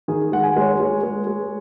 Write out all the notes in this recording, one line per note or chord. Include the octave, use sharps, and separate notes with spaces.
D#3 G#4
G#3 F#5
G#5
G#3 C#5
G#3
G#3
G#3